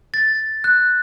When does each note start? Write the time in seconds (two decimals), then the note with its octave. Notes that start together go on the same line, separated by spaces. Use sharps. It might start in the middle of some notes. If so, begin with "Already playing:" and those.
0.14 A6
0.64 F#6